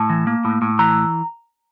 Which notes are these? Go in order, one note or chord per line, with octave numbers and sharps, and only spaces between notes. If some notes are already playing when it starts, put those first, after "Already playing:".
Already playing: A2 A5
E3
A#3
A2
A2
E3 A#5